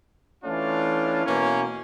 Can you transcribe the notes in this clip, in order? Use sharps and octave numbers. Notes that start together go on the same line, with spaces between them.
E3 A3 C#4 D4 F4
B2 E3 A#3 C#4